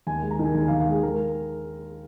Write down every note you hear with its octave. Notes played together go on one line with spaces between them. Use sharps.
D#2 G#5
G#3
A#5
D#3 G#5
D#2 G#5
D#2 F5
F5
G#3 G#4
G#3 A#4